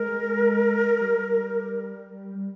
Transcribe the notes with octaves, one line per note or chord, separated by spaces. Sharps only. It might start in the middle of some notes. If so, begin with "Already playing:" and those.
Already playing: G#3 A#4
G3